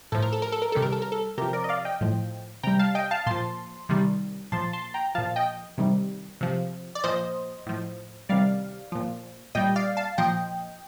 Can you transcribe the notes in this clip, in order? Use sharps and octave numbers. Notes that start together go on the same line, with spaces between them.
A2 F3 A4
A#4
A4
A#4
A4
A#4
C3 D#3 G3 A4
A#4
A4
A#4
A4
C3 F3 G4 A#4
A#4 D5
D#5
D5 F5
D#5 G5
A2 F3
C3 G3 G5 A#5
F5 A5
D#5 G5
F5 A5
A#2 F3 A5 C6
C3 D#3 G3
A#2 F3 A5 C6
A5 C6
G5 A#5
A#2 F3 F5 A5
D#5 G5
C3 D#3 G3
C3 F3
D5
A#2 F3 C5 D#5
A2 F3
C3 D#3 G3 D5 F5
A#2 F3
A#2 G3 D#5 G5
D5 F5
F5 A5
A#2 F3 D#5 G5